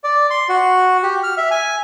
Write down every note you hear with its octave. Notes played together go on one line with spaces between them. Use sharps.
D5
C6
F#4
G4
F6
E5
G#5